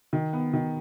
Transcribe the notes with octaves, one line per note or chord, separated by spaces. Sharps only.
D#3
B3
D#3